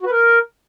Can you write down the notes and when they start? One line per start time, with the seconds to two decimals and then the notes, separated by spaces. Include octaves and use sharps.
0.01 F#4
0.06 B4
0.11 A#4